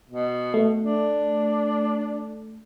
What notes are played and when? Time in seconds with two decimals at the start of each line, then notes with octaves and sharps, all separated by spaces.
0.09 B2
0.54 A3
0.84 D4